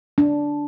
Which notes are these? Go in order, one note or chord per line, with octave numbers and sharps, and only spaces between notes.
D4